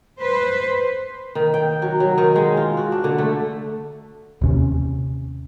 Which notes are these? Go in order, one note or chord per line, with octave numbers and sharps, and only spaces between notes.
B4 C5
D#3
G5
F#3
F#3
D#3
G#3
F4
F#4
D4
D3
A3
D#2 C3 C#4